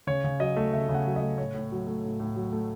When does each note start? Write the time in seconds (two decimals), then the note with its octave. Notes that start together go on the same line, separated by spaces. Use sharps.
0.07 C#3 C#5
0.24 C#3
0.40 F#3 D#5
0.56 A3
0.73 C#3 E5
0.89 C#3
0.94 F#5
1.06 F#3
1.16 D#5
1.22 A3
1.38 A2 C#5
1.54 A2
1.71 F#3
1.87 A3
2.04 A2
2.20 A2
2.36 F#3
2.52 A3